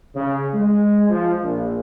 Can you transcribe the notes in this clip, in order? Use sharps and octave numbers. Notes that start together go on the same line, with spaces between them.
C#3
G#3
F3
A#1